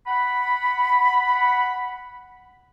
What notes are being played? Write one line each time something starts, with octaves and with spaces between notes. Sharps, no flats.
F#5 B5